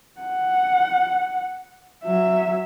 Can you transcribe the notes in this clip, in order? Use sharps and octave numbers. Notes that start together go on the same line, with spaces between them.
F#5
F#3 E5